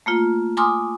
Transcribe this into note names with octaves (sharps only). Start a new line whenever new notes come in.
A3 A#3 F4
G#5 A#5 C6 D6 D#6 F6